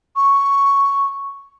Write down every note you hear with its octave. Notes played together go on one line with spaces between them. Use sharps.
C#6